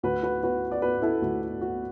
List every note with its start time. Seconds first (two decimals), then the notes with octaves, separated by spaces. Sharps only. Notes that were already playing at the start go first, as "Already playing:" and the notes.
0.03 D2 F#4 B4
0.23 F#4 B4
0.43 B3 F#4 B4
0.72 D5
0.82 B3 F#4 B4
1.02 E4 A4
1.22 D2 F#4
1.42 F#4
1.61 B3 F#4